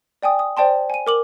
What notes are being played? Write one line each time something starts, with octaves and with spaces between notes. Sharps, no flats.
D5 G5 G#5 D#6
D#6
C5 D5 G5 A5 C6
G#5 D#7
A#4 D6 F#7